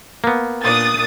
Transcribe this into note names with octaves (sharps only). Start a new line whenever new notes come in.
A#3 B3
A#2 D4 D#6 A6